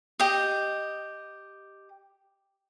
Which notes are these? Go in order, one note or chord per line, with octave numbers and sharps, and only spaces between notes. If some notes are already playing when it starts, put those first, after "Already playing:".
G4 D#5